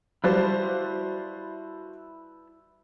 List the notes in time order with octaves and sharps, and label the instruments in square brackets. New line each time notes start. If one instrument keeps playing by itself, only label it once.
[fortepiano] G3 [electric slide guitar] E4 B4 A5 [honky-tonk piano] F#4 C5 F5